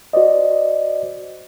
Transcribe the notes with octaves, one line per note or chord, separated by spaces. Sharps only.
F#4 C5 D5 D#5